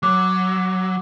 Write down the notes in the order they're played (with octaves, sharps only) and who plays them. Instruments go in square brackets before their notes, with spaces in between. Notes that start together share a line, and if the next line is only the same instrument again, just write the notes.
[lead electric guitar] F#3 [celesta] D6 F#6